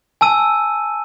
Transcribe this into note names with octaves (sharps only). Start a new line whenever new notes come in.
G#5 A5 E6 D#7